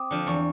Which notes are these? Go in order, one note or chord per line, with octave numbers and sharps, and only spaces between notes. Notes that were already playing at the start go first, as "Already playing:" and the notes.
Already playing: C4 D6 D#6
D3 F3
E2 C#6